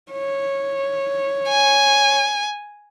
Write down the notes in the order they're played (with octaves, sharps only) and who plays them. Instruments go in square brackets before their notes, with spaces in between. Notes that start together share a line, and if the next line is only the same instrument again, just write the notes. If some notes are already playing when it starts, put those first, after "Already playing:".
[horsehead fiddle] C#5
[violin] G#5